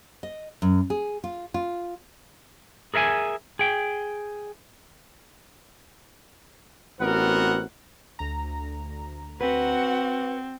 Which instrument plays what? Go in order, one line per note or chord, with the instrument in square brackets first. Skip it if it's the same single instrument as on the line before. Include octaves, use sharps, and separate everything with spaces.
[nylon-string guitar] D#5
F#2
G#4
F4
F4
[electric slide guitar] G#4 A#4 E5 F5 G#5
G#4 G5
[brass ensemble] A1 B3 C4 F#4 A#4 F#5
[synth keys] D2 A#5
[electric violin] C4 [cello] F#4 F#5 [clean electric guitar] B4